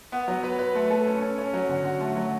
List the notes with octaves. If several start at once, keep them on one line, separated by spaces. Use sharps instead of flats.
B3
F#3
B4
B4
A3
A4
C#4
C#4
C#4
F#3
D3
F#4
A3
F#3